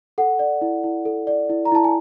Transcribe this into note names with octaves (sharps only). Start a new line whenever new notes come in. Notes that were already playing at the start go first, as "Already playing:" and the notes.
A4 F#5
D5
E4
E4
A4
D5
E4
A#5
E4 A5
G#5